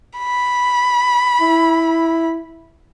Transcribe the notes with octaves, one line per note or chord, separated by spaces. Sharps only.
B5
E4